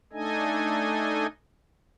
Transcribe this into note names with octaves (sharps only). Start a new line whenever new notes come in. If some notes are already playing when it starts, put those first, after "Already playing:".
A3 D4 D#4 A4 D#5 G#5